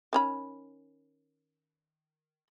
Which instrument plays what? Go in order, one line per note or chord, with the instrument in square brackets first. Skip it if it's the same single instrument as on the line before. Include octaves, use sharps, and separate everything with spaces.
[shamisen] D#3 C#4 B5